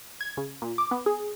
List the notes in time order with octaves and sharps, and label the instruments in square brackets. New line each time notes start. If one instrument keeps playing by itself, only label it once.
[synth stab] G#6
C#3
A#2
D6
B3
G#4